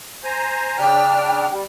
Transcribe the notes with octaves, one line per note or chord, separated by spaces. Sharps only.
C5 G#5 A#5
C#3 D4 G5 F6
G3